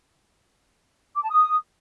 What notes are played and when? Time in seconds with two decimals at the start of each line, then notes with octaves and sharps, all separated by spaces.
1.15 D6
1.23 A5
1.31 D#6